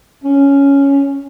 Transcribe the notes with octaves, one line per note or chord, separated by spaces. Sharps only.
C#4